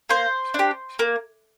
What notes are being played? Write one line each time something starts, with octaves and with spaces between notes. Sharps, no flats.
A#3 C5
D4 G4
A#3